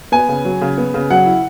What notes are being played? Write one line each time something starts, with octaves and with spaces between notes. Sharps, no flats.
B3 G#5
C#3
F#3
C#3
B3
C#3
F#3 F#5
E4